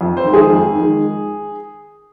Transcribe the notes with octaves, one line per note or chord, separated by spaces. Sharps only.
F2
C5
D#3 G#3
G#4
F2
D#3 G#3